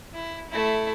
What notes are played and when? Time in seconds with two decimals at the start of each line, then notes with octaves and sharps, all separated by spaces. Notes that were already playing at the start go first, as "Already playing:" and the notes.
0.14 E4
0.50 A3 E4